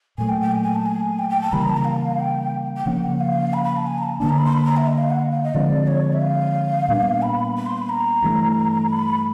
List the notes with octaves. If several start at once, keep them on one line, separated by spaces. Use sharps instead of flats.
A#2 F#3 A3 G#5
G5
G5
G#5
G#5
A5
G#5
G5
G5
A5
C#3 E3 G3 A#3 B5
A#5
A5
A#5
F5
G5
G5
C#3 F3 A#3 C#4 F#5
F5
B5
B5
A5
G#5
A#5
A5
D3 F#3 A#3 D4 A5
A#5
B5
C6
B5
A#5
E5
D#5
F5
F#5
F5
D#5
D3 F3 G#3 C4 D5
C#5
E5
F5
A#2 G3 B3 D4
B5
B5
C6
B5
A#5
G2 E3 A3
B5